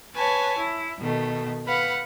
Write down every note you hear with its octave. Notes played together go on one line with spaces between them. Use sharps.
B4 C#5 G#5 A5
E4
B2 D#3 A3
B4 F5 F#5 B5